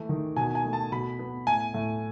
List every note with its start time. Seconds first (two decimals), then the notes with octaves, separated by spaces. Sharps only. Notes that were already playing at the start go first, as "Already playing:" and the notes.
Already playing: E3 A3
0.09 D#3
0.36 B2 G#5
0.55 G#5
0.65 A3
0.73 A5
0.92 B2 B5
1.19 B3
1.47 A2 G#5
1.74 A2